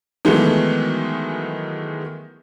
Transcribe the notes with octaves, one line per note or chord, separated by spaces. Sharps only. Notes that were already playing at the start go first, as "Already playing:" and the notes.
D#3 E3 F#3 G#3 A3 B3